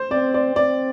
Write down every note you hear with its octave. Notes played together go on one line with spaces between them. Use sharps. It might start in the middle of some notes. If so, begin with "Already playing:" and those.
Already playing: C5
C4 D5
D5
C4 D5